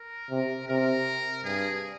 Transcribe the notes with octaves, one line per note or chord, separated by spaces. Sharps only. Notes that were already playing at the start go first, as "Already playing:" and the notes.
Already playing: A#4
C3
C3 A#4
G2 G#4